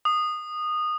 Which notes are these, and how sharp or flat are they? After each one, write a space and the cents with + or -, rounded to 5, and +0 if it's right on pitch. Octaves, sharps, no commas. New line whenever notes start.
D#6 -20